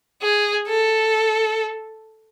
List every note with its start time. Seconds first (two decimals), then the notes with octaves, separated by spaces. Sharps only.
0.22 G#4
0.68 A4